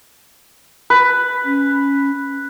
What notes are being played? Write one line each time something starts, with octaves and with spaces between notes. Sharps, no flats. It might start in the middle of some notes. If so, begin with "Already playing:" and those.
B4
C#4